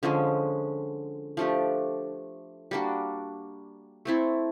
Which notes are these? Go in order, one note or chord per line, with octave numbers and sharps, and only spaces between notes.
D3 F3 G#3 C#4
F3 A3 D4 G4
G3 A#3 D4 F#4
A3 C4 E4 A4